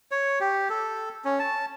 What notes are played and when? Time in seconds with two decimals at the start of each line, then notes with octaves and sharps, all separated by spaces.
0.11 C#5
0.40 G4
0.70 A4
1.25 C#4
1.39 A5